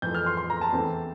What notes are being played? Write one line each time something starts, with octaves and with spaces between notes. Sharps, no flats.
F2 E3 A3 G6
F6
C6
C6
A#5
A5
E2 E3 A3 C4